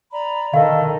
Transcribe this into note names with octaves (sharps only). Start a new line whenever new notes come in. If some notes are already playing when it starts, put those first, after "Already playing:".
D5 A#5 B5
D#3 A4 D#5 F5